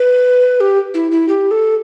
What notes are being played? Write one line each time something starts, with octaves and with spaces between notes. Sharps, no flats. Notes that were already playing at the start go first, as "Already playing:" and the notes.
Already playing: B4
G4
E4
E4
G4
A4